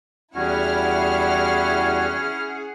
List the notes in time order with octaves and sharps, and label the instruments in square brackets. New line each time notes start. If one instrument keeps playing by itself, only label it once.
[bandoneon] E2 G3 F#4 [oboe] C#4 [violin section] E4 F6 [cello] G#4 F#5